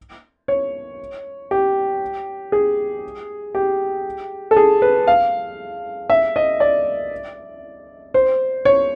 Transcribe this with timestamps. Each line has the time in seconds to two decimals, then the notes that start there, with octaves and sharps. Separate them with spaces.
0.48 C#5
1.51 G4
2.52 G#4
3.55 G4
4.51 A4
4.56 G#4
4.82 B4
5.07 F5
6.10 E5
6.36 D#5
6.60 D5
8.14 C5
8.65 C#5